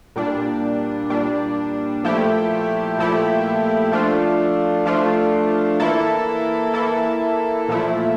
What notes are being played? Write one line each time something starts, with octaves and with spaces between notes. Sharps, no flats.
A#2 G3 D4
A#2 G3 D4
A#2 F3 A3 E4 G4
A#2 F3 A3 E4 G4
F3 A3 D4 F4
F3 A3 D4 F4
E3 A#3 E4 A4
E3 A#3 E4 A4
A#2 F3 A3 E4